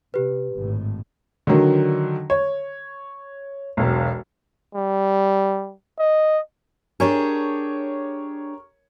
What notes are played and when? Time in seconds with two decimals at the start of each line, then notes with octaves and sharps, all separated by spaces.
0.14 C3 G4 B4
0.53 G#1 A2
1.47 D3 D#3 F#3
2.30 C#5
3.77 E1 B1
4.75 G3
5.99 D#5
7.00 D4 G4 G#4 A#4 C#5